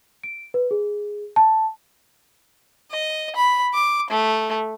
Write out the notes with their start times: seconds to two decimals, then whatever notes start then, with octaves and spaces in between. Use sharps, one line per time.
0.24 D7
0.54 B4
0.71 G#4
1.36 A5
2.91 D#5
3.36 B5
3.74 D6
4.10 A3